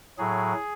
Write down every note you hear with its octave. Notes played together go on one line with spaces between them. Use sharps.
A2 F#3 G#4